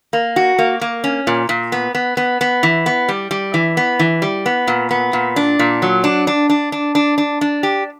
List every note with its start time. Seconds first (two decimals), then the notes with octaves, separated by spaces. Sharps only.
0.13 A#3
0.36 F#4
0.58 A#3
0.81 A#3
1.04 C#4
1.27 A#2
1.49 A#2
1.72 B3
1.95 B3
2.17 B3
2.41 B3
2.63 E3
2.86 B3
3.09 G3
3.31 G3
3.54 E3
3.77 B3
3.99 E3
4.22 G3
4.46 B3
4.67 A#2
4.91 B3
5.13 A#2
5.36 D4
5.59 A#2
5.82 F#3
6.04 D4
6.27 D4
6.49 D4
6.72 D4
6.95 D4
7.18 D4
7.41 D4
7.63 G4